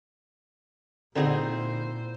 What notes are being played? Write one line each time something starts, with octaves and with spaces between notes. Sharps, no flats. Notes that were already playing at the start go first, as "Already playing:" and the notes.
A#2 D3 C4 D#4 E4 F#4 G#4 C5